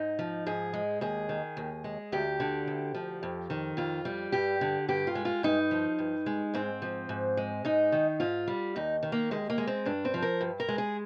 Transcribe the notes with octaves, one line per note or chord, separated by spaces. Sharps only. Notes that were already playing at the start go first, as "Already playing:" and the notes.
Already playing: G#2 D#4
F3
G#2 G#4
G#3
D#2 G#4
D#3
D#2
G#3
D2 G4
D3
D2
F3
F2
D#3
F2 F4
G3
G2 G4
D3
G2 G4
F4
G#3
F4
G2 D#4
F3
G2
G#3
G#2 C4
F3
G#2
G#3
G#2 D#4
D#3
G#2 F4
G3
D#2 D#4
D#3
A#3
D#2 G#3
A#3
G#3
C4
G2 D4
C4
F3
A#4
G2
A#4
G#3
G#4